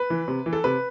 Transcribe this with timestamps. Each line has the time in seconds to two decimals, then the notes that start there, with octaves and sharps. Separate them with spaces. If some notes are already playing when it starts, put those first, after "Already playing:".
Already playing: B4
0.10 E3
0.28 C3
0.46 E3
0.53 A4
0.64 C3 B4